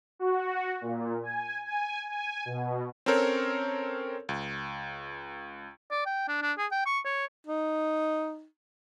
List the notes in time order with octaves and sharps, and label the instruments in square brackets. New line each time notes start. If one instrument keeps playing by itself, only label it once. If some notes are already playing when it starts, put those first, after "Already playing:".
[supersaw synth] F#4
A#2
G#5
G#5
G#5
B2
[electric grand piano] C4 C#4 A4 A#4 C5 C#5
C#2
[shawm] D5
G5
D4
D4
G#4
G5
C#6
C#5
[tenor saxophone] D#4